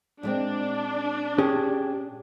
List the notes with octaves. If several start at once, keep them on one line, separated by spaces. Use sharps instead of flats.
A#2 G#3 C4 D4
C#4 G4 G#4